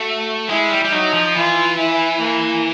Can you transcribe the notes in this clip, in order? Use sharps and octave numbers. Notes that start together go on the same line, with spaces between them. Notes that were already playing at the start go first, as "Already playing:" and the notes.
Already playing: A3 F#4
G#3 E4
G3
G3
F#3 D#4
F3
E3 F4
E4
A#3